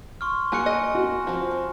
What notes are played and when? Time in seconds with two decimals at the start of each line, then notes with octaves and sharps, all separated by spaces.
0.21 C6 C#6 F6
0.52 A#3 F#4 G#4 G#5 F#6 C#7
0.66 D#5
0.95 F#4
1.27 F3 C4